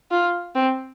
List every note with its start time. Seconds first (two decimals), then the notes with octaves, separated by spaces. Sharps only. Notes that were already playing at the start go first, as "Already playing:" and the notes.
0.11 F4
0.55 C4